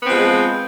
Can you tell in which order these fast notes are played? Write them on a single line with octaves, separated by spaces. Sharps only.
B3 C4 F3 G#3